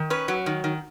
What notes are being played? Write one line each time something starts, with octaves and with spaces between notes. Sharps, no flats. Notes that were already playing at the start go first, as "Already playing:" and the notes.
Already playing: D#3
C#4 B4
F#3
D#3
D#3